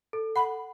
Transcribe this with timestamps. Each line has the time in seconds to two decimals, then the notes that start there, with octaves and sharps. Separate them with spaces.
0.13 A4
0.36 F#5 B5